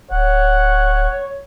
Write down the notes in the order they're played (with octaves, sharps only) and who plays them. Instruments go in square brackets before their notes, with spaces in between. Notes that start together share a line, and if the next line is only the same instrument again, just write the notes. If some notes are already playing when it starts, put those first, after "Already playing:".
[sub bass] D1 [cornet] C#5 [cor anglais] F#5